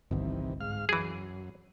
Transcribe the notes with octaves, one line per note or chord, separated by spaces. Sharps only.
G1 C2 C3 D#3 E3
G#2 F5 F6
F#2 E3 G#4